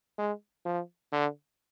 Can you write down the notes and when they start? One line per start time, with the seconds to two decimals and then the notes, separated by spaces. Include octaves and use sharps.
0.18 G#3
0.65 F3
1.12 D3